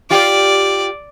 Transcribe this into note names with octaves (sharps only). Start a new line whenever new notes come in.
F4 G4 D5